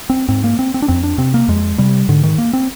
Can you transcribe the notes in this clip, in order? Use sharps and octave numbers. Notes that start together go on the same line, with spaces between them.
C4
G#2 C4
A#3
C4
C4
D4
F2 C4
D4
C3 C4
A#3
F2 G#3
C3 G3
G#2 D3
D#3
A#3
C4